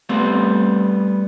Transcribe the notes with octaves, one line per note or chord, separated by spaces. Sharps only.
G3 A3 B3 C4